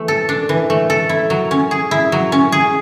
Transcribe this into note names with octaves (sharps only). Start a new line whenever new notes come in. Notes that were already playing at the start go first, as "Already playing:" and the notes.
Already playing: E3 A3
A4
D4
E3
A3
A4
E4
F#3
C#4
G#4
E4
F#3
C#4
G#4